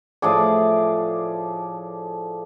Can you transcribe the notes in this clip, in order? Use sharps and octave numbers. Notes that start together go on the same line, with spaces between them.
A2 F3 G#4 D5